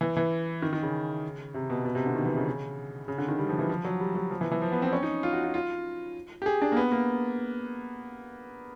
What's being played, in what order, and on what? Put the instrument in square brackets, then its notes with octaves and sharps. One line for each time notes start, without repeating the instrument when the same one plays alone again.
[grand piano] E3
E3
D#3
D#3
C#3
C3
B2
B2
C3
D3
D#3
E3
C#3
C#3
D3
D#3
G3
F3
E3
F3
F#3
G3
F#3
F3
E3
E3
F3
B3
C4
C#4
D#4
F4
F#4
F4
F4
G4
G#4
D4
A#3
B3
A#3